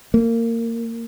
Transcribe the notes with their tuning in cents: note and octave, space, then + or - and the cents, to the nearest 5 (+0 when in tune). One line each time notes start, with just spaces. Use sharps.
A#3 -20